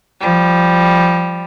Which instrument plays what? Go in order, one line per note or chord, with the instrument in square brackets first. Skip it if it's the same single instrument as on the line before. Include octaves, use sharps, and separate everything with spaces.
[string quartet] F3 G3